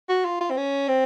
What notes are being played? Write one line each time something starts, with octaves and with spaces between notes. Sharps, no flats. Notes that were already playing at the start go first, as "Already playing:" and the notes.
F#4
F4
F4
C4
C#4
C4